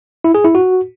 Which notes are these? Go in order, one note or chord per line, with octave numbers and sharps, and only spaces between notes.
E4
G#4
E4
F#4